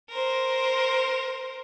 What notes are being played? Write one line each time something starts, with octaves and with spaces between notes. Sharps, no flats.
A#4 C5